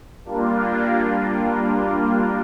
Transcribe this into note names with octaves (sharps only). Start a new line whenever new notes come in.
G3 A#3 D4 F4